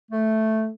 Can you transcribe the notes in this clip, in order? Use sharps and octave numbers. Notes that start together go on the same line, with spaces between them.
A3